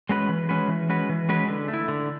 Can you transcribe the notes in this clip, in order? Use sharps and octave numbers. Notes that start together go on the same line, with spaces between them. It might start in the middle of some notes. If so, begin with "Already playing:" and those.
G#3 C#4 F#4 B4
E3
G#3 C#4 F#4 B4
E3
G#3 C#4 F#4 B4
E3
G#3 C#4 F#4 B4
D3
A3
E4
D3